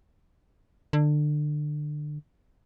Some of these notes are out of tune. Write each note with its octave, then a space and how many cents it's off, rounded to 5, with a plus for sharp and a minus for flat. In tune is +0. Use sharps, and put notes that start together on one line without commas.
D3 +25